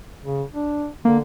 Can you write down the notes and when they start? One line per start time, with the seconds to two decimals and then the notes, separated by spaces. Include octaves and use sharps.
0.24 C#3
0.54 D4
1.05 D3 A#3